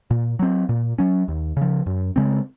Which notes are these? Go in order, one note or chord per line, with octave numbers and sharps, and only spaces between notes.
A#2
F#3 C4
A#2
F#3 C#4
D#2
C#3 F3
F#2
C#3 G#3 C4